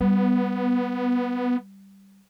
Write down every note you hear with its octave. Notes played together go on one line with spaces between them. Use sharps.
G3 B3